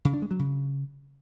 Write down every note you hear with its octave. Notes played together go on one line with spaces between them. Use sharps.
C#3
D4
G#3
F#3
C#3